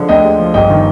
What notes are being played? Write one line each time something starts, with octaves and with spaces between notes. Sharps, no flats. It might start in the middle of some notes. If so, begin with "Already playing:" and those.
Already playing: D3 F3 G#3
D2 D#5 G5
G#3
F3
G1 D#5 G5
D#3